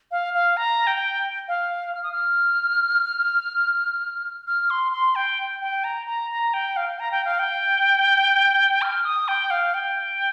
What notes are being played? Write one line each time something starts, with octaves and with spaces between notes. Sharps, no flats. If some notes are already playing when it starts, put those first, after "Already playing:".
F5
F5
A#5
G5
F5
F6
D#6
F6
F6
C6
C6
G5
G5
A#5
A#5
A#5
G5
F5
A#5
G5
F5
G5
F6
D#6
G5
F5
G5